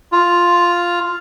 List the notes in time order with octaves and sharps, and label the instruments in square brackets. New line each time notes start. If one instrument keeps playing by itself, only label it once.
[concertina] F4